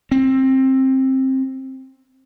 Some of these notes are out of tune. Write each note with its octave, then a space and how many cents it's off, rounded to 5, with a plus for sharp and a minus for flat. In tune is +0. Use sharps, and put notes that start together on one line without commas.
C4 +15